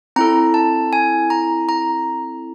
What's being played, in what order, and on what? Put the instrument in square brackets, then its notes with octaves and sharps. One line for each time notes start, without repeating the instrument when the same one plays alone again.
[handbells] C4 E4 A4 A#5
A5
G#5
A#5
A#5